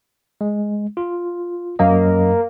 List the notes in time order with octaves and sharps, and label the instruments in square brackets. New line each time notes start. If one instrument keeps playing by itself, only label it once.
[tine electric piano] G#3
F4
[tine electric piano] F#2 F#3 D#5 [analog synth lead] A#3